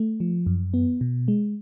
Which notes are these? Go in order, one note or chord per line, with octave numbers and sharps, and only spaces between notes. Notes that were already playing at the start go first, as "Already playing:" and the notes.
Already playing: A3
F3
F#2
B3
B2
G#3